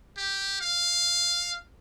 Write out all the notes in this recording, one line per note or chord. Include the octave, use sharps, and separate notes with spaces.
G4
F5